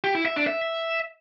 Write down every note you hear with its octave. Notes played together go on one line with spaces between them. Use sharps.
G4
E4
E5
D4
E5